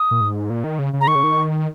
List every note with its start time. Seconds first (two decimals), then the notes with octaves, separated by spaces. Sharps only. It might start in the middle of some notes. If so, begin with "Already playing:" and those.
Already playing: D#6
0.11 A#2
0.21 G#2
0.50 A#2
0.64 D#3
0.79 C#3
0.93 C#3
1.01 A#5
1.07 D#3 C#6
1.15 C#3
1.23 D#3